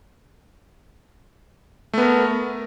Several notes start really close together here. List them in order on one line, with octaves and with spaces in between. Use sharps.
A3 B3 A#4